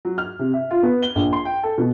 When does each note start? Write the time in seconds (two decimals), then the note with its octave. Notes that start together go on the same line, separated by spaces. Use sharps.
0.05 F#3
0.18 F6
0.39 C3
0.53 E5
0.71 F4
0.83 B3
1.02 G7
1.15 A#1
1.33 C6
1.45 G5
1.63 A4
1.78 B2